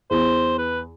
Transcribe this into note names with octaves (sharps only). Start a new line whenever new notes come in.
E2 C5
B4